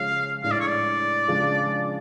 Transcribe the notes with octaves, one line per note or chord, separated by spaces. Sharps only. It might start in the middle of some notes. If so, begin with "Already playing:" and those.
Already playing: C#3 F3 G#3 C#4 F5
A2 G#3 D4 F5
D5
C#5
D5
C#3 F3 G#3 D4